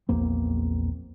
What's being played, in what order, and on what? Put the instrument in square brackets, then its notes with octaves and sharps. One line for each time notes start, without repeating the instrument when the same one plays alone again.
[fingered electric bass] A#1 E2 A#3 C4